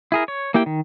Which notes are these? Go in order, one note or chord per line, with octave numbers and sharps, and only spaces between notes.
E4 G#4 A#4
C#5
A#3 E4 G4 G5
D#3